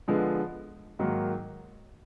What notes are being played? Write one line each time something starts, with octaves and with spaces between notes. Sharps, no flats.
D3 F3 G#3 B3
G#2 D#3 F#3 A#3